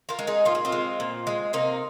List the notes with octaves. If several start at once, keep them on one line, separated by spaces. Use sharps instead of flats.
F4 A#4
G#3
D#4 G#4
A#2 F4
G#4
C4 F4
G#3
A#2
G#3
C3 A#3 D#4